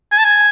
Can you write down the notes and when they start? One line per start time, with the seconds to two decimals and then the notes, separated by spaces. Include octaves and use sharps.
0.11 G#5
0.18 A5
0.24 G#5